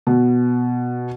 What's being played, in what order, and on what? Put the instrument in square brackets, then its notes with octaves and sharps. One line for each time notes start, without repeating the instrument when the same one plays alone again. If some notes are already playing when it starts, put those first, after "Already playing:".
[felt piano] B2